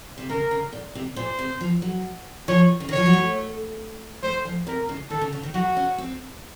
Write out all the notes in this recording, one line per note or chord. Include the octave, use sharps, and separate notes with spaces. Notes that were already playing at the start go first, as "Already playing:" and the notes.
C3
C#3 A#4
C#3
A#2
C3
A#2 C5
C3
F3
F#3
F3 C#5
C#3
D#3
F3 C#5
F#3
A3
A3 C5
F3
C3 A#4
C#3
D#3 A4
C#3
C#3
D#3
F#3 F#4
C#4
C4